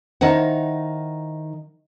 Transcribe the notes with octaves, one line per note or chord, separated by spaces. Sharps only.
D#3 D#4 E4 C5 F#5